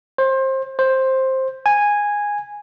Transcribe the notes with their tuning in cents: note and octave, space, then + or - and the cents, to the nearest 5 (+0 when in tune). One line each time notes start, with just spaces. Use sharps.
C5 +25
C5 +10
G#5 -10